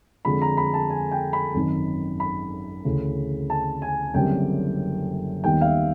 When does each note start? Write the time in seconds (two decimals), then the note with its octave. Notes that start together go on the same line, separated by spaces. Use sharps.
0.25 F2 D3 F3 G#3 B5
0.42 A#5
0.57 B5
0.74 A5
0.90 G#5
1.11 G5
1.33 B5
1.55 G#1 F#2 D#3
2.20 B5
2.85 D2 C#3 E3
3.50 A5
3.82 G#5
4.14 F#1 F#2 D3 G3 C4 G5
5.44 D#2 D#3 G3 B3 G5
5.61 F5
5.66 E5